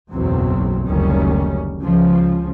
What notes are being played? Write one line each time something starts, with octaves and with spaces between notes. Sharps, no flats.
F#1 B1 E2 F#3 C4
F#1 D2 D#3 G3 C#4
C#2 C#3 F3